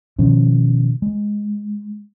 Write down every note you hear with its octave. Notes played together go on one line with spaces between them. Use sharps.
B2 D#3 F3 C#4
G#3